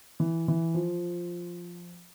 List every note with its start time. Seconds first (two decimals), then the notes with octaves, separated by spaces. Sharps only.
0.20 E3
0.48 E3
0.74 F3